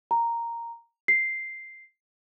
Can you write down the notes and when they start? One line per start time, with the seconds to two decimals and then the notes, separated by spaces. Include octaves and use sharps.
0.11 A#5
1.08 C7